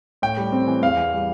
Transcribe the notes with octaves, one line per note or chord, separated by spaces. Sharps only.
A2 G5
G3
C4
E3
E2 F5
E3
G3